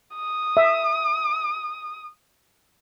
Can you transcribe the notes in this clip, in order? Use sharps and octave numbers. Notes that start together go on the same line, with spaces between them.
D#6
E5